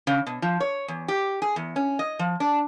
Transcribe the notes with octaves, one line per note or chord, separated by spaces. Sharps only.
C#3
B2
F3
C#5
E2
G4
G#4
E2
C#4
D#5
F3
D4